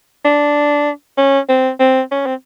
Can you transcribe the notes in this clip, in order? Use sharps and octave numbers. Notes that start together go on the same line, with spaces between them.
D4
C#4
C4
C4
C#4
C4